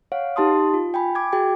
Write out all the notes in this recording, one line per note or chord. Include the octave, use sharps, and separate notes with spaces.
C#5 F5 F#5
D#4 G4 A5 C6 D#6
F4
G5 G#5 B5
D6 G#6
F#4 G#4 G5